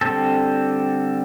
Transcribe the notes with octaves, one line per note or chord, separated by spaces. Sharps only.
D3 G3 C4 A4